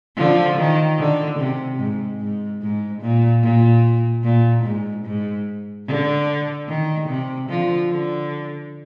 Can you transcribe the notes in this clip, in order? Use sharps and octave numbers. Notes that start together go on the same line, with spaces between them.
D3 F3
D#3
D3
C3
G#2
G#2
G#2
A#2
A#2
A#2
G#2
G#2
D3
D#3
C3
D3 F3
D3